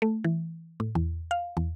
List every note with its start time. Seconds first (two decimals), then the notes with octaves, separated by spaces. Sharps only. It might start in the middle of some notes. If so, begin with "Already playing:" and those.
0.02 A3
0.24 E3
0.80 A2
0.95 E2
1.31 F5
1.57 E2